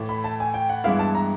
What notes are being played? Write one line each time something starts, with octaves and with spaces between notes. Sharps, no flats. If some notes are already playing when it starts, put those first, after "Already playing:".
Already playing: A2 E3 A3
B5
A5
G#5
G5
F#5
G2 E3 G#3 B3 E4 F5
A5
A#5